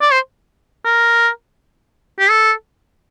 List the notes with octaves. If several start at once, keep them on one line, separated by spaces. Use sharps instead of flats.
D5
C5
A#4
G4
A4